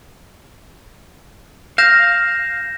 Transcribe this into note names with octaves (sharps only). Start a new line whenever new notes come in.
F5 G6 A#6 E7